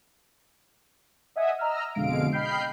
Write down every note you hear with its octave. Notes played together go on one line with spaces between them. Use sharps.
D#5 E5 F#5 G#5 D#6
D#5 A#5 E6 F6
F2 B2 D3 G#3 F5 D7
D#5 G5 B5 F6 G6 C7